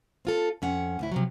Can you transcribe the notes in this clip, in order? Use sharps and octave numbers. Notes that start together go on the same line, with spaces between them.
C4 F4 A4
F2 C#4 F#5
D2 A2 E4
C3 F3 F#3